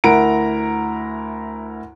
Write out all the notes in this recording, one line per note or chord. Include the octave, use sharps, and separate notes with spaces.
D2 E4 A#4 F#5 A#5 D7